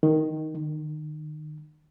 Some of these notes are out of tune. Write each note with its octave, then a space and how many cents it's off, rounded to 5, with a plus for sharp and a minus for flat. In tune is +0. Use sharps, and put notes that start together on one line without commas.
D#3 +5
D#3 -30